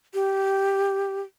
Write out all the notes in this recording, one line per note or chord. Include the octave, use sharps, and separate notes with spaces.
G4